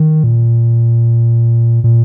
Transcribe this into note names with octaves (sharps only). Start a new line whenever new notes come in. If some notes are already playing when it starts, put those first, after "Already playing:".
Already playing: D#3
A#2
A#2